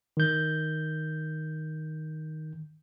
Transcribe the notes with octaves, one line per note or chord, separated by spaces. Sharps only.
D#3 G6